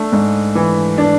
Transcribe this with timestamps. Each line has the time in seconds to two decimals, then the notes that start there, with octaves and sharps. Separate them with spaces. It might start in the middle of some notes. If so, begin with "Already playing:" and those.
Already playing: A3 D4
0.12 G#2
0.55 E3
0.98 D4